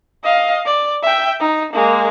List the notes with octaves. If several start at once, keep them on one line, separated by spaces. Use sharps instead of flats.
D#5 F5
D5
E5 G5
D#4
G#3 A#3